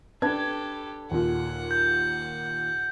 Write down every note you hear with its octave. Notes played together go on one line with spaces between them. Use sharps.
D4 G4 A4 B4 G#6
D#2 A#2 F#5
G6